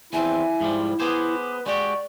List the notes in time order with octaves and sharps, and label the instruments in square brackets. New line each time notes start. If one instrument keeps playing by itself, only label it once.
[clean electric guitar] E2 C4 [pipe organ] E4 [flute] E5 [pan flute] G#5
[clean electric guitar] G#2 F3 G3
[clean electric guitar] B3 G#4 C5 [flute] B4 [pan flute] D6
[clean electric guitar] G#3 F#4 G4 [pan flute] D5 [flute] C#6